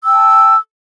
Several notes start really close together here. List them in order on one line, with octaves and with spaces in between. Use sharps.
E6 G5 A5